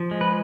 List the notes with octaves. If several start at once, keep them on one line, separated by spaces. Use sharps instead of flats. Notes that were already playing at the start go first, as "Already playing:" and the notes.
Already playing: F3
G#3
B4